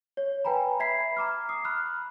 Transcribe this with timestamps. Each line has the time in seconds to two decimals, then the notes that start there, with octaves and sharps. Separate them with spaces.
0.17 C#5
0.45 B4 G5 G#5 A#5 B5
0.80 E5 B5 G#6 B6 C7
1.17 A#5 D6 F6
1.49 D#6 C7
1.65 B5 F6 F#6